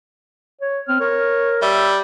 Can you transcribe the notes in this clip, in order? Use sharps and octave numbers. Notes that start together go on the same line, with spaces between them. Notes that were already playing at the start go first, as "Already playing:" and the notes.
C#5
C4 F6
A#4 C#5
G3 E5